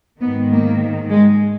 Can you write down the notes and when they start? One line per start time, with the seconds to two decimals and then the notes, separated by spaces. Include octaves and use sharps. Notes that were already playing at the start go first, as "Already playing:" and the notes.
0.21 G#2 D#3 B3
0.51 A#3
1.09 G#3